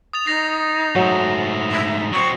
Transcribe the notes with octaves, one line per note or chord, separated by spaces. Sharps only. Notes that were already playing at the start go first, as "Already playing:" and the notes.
D#6 A6 F7
D#4 A#6 C7 F7
G#2 F#3 A3
E5
F#3 C4 C#6